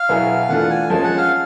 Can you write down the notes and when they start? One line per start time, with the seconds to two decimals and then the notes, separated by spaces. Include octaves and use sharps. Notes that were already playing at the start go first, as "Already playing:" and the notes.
Already playing: F5
0.09 B2 F#3 B3 E4 G#4
0.49 E3 A3 D4 F4 A4 F#5
0.70 G#5
0.90 F3 G#3 C#4 A5
1.04 F#5
1.18 F5